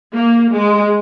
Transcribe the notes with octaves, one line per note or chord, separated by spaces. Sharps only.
A#3
G#3